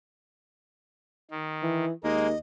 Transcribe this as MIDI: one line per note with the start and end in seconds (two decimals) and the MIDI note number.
1.31 1.85 51
1.63 1.91 52
2.04 2.34 39
2.04 2.27 56
2.04 2.27 58
2.04 2.38 75